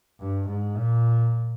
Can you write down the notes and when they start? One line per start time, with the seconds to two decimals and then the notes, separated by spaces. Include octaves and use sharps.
0.20 G2
0.48 G#2
0.75 A#2